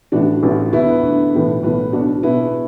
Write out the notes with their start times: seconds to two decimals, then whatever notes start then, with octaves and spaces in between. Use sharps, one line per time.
0.12 A1 A2 E3 D4 F#4
0.43 A1 A2 E3
0.73 D2 D3 B3 E4
0.88 B3
1.03 D2 D3
1.34 B1 A2 E3
1.63 B1 A2 E3 B3
1.93 B1 B2 D4 F#4
2.23 B1 B2 B3 E4
2.39 B3